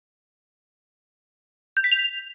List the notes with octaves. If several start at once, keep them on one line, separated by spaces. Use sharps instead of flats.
G6
B6
F7